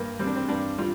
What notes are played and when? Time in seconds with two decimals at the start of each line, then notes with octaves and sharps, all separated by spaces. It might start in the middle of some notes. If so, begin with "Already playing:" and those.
Already playing: G2 A#3
0.19 G3 C4
0.27 D4
0.36 C4
0.49 G2 D4
0.78 G3 F4